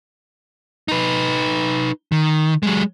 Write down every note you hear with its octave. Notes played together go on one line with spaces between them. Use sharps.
D#4 B4
D#3
F#3 G#3